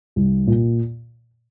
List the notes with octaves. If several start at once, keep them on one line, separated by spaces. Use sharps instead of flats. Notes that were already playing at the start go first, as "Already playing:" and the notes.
C2
A#2